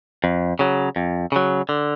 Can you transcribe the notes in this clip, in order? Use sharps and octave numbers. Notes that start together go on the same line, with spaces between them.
F2
C#3 F#3
F2
C#3 F#3
D3